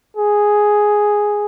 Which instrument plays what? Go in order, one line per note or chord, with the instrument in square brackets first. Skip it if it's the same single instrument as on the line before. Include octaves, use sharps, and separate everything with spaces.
[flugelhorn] G#4